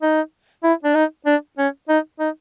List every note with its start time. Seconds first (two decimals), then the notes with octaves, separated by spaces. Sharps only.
0.02 D#4
0.63 E4
0.84 D4
0.95 D#4
1.26 D4
1.58 C#4
1.89 D#4
2.20 D#4